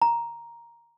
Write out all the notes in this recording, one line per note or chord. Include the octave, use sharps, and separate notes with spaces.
A#5